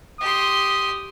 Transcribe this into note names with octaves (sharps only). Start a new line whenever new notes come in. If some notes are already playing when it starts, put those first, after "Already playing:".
G4 C6 D#6